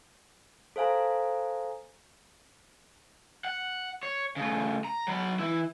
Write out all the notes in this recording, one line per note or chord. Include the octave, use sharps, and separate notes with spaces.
A4 C5 F5 G#5 A#5
F#5
C#5
C#3 A3
A#5
F#3 B5
E3 E4